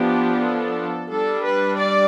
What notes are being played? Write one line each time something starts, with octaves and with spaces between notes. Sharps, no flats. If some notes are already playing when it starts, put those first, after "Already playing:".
Already playing: F3 B3 D4 G4
A4
G3 D4 A4
B4
D5